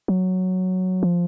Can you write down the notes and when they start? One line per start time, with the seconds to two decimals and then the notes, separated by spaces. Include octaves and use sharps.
0.08 F#3
1.03 F3